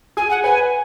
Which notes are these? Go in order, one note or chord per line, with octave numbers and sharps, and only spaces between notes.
G#4 G#5
F#5
B4 G#5